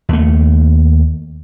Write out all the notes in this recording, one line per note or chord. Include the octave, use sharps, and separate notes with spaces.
D#2 A3